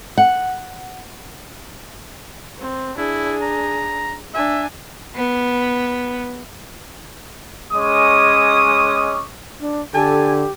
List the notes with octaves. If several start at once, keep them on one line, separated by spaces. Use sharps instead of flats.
F#5
C4
D4 E4 G#4
A#5
D4 E5 G#5
B3
G#3 C#4 C#5 D#5 D6 D#6
D4
D3 G4 A4 G#5 A5